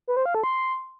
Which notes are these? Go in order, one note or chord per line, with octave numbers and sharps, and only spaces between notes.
B4
C5
F5
A4
C6